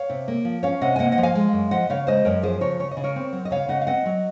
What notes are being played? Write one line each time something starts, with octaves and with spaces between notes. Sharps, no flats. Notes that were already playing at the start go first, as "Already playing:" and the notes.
Already playing: C#5 F5
C3
A#3
F3
C#4 C#5 F5
C3 D#5 F#5
G#5
A#3 D#5 F#5
D#5 F#5
F3
F5 G#5
G#3
F#2
F3 D#5 F#5
C#3 C#5 F5
G#3 C5 D#5
F#2 A#4 C#5
F3 G#4 C5
C#3 A#4 C#5
C#3 C#5
D#5
C#3
A#4 C#5
C4
F#3
D#5
C#3 C#5 F5
C#3 D#5 F#5
F5
C4 D#5 F#5
F#3